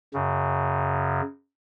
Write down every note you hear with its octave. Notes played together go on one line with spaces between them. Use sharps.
F#2 C#3